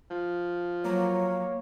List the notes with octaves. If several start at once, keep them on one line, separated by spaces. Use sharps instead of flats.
F3
F#3 A#3 C#5